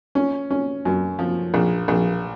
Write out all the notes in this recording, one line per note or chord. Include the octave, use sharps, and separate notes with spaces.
C#4
C#4
F#2
F3
A#1
A#1